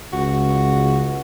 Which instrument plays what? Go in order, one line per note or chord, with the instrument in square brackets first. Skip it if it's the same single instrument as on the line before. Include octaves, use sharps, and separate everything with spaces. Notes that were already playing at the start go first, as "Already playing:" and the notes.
[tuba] C#2 [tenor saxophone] F#4